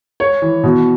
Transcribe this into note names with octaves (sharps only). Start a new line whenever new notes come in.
C#5
E3
B2